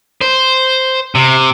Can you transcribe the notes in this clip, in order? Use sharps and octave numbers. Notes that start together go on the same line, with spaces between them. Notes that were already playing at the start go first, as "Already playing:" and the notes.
C5
C3